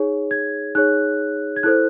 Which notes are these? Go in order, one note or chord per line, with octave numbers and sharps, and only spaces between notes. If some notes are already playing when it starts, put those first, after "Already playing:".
Already playing: D#4 G#4 C#5
G#6
D#4 G#4 C#5 F#6
G#6
E4 A4 C5 F#6